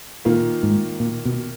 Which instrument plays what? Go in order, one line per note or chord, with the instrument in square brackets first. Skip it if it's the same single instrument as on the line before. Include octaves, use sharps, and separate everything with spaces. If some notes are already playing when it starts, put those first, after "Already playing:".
[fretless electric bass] A#2 [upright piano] D#3 A#3 F4
[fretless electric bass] G#2
A#2
B2